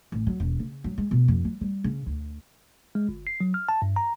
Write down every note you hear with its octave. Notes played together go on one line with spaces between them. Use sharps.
A1
F#3
E1
C#3
F#3
G#3
B2
F2
F#3
G3
C#3
D2
G#3
G1
C7
F#3
F6
A5
G2
A#5